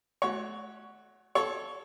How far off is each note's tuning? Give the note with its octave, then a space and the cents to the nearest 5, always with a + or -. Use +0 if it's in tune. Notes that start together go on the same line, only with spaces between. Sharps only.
A3 -35 F#4 +0 C#5 +0
A4 -20 C#5 +0